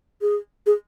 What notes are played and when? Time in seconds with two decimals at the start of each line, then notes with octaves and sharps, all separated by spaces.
0.22 G#4
0.66 G#4